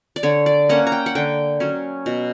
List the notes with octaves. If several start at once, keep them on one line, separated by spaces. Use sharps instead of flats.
D5
D3 C#5
D5
A#3 C#4 F#5
A#5
G5
F#5
D3 G5
F#3 C#4
B2